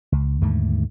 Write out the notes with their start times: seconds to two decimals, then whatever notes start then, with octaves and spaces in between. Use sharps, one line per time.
0.12 C#2
0.41 D#2 G#2 D3 A3